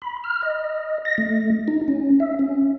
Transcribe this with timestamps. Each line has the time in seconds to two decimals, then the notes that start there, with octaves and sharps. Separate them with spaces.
0.02 B5
0.24 F6
0.42 D#5
1.05 A#6
1.18 A3
1.68 D#4
1.88 C#4
2.20 E5
2.39 C#4